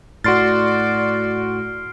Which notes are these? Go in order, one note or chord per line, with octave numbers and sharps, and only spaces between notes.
A2 F#4 D5 C6 F6 A6 C7 D7